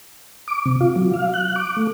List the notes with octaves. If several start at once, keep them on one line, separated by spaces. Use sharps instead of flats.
D6
C3
F4
F#3
F5
F#6
D6
A3